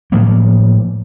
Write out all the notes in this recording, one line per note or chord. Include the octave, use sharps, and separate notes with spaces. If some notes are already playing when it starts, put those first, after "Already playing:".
A2 F3 A#3